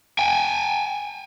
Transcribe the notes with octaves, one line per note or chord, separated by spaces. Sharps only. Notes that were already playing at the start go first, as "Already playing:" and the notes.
G5 G#5